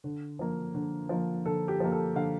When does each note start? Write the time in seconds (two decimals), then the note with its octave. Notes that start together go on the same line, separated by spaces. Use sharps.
0.04 D3
0.39 F3 A#3
0.75 D3
1.09 F3 A#3
1.45 D3 A4
1.68 G4
1.80 F3 A#3
1.92 A4
2.15 D3 F5